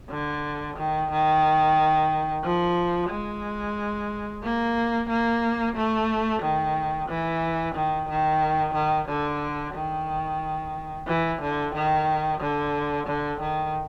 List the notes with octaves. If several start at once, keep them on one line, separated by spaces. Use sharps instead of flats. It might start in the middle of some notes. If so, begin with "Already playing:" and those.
D3
D#3
D#3
F3
G#3
A#3
A#3
A3
D#3
E3
D#3
D#3
D#3
D3
D#3
E3
D3
D#3
D3
D3
D#3